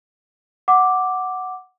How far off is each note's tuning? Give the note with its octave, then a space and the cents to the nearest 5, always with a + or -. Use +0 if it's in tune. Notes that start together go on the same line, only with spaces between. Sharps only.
F#5 +0 D6 +0